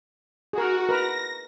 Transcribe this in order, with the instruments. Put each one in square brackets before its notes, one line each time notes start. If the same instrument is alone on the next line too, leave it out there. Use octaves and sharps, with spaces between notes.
[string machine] F#4 [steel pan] G#4 A#4
[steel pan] A#4 B4 [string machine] A#6